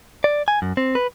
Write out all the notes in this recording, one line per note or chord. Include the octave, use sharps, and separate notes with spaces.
D5
G#5
F#2
C4
B4